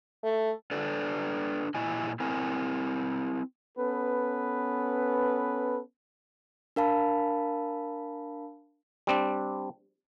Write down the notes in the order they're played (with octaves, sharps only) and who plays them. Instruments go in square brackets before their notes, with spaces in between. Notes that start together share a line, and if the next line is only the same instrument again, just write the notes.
[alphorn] A3
[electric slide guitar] D4 A4 B4 D5
A#2 E4 D#5 G#5
C4 E4 A#4 G#5
[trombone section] B3 C#4 A4 B4
[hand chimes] D4 A#4 F5 A5 B5
[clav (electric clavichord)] G3 C4 D4